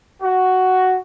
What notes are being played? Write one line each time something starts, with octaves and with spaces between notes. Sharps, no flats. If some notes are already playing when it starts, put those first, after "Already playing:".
F#4